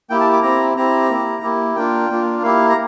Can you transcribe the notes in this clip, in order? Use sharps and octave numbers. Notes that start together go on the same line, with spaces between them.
A#3 E4 G4 G5
A5
D6
C4 E4 G4 A#5
C4 E4 G4 A#5
A#3 E4 G4
A#3 E4 G4
A#3 D4 F4 G5
A#3 D4 F4
A#3 E4 G4 F5
A#5